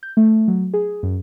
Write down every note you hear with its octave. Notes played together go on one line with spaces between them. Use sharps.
G6
A3
F#3
G#4
F#2